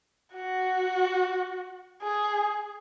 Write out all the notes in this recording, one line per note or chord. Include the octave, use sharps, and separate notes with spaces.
F#4
G#4